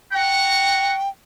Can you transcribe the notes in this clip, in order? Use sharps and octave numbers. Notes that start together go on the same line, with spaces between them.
F#5 G5 A#5 C#6